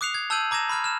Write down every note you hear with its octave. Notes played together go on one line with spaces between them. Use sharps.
D6 D#6 F#6 C7 C#7 F7
G#6
A5 E6 G6 G#6 D#7 F#7
A#5 D6 G#6 A#6 E7
B5 D6 F6 G#6
F6 E7